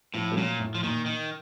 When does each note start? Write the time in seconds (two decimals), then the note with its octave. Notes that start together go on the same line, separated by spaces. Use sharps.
0.14 A2 F3
0.32 A3
0.36 A#2 F#3
0.60 A2
0.75 F3
0.83 A#2 D#3
1.06 D#3